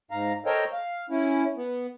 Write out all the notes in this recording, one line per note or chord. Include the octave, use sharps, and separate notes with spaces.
G#2 F5 A#5
A4 A#4 C5 C#5 D#5 G5
F5
C#4 E4
B3